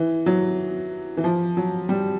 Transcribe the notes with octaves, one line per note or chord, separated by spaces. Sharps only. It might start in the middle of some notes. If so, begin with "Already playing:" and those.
Already playing: E3
F#3
E3
F3
F#3
G3